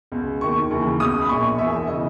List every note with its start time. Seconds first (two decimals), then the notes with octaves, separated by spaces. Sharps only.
0.12 C#2 B2
0.41 D#2 D#3 C#6
0.71 D#2 C#3 E3
1.00 C#2 B2 D#6
1.21 B5
1.29 A#1 A#2 C#6
1.58 E1 E2 B2 E5
1.87 C#3 E3 D#5